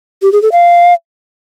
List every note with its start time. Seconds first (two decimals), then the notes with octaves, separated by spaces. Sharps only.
0.22 G4
0.32 G#4
0.42 A4
0.52 F5